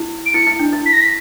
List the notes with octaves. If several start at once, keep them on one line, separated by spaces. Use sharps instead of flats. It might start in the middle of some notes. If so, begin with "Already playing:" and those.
Already playing: E4
D7
E4 C#7
E4
D4
E4
B6
A#6
B6